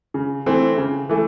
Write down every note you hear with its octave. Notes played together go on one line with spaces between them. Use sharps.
C#3
E3 A3 C4
C#3
E3 A3